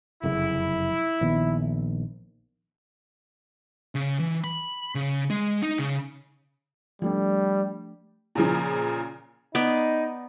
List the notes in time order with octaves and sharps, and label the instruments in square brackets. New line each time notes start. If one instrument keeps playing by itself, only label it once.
[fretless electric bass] F1 F#2 C#3 [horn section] E4
[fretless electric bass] A#1 D#3 B3
[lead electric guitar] C#3
E3
B5
C#3
G#3
D#4
C#3
[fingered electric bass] F3 A3 D4 [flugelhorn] G3
[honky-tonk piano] A#2 C#3 F3
[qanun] B3 D5 [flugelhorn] D#4